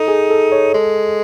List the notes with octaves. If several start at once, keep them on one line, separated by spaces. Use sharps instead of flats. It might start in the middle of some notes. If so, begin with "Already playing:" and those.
Already playing: D#4 A4
G#4
A4
C#5
G#3 A4